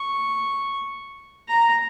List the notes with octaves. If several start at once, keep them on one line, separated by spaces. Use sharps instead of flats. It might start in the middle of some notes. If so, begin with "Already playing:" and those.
Already playing: C#6
A#5